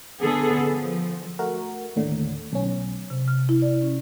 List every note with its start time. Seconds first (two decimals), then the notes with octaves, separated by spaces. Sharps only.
0.22 D3 B3 G#4 A4
0.71 F3
1.39 A3 F#4 A#4
1.96 D#2 A2 D3
2.53 B1 C#4
3.10 C3
3.28 F6
3.49 E4
3.62 D5
3.82 C#4